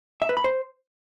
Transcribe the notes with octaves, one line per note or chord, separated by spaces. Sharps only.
E5
B4
B5
C5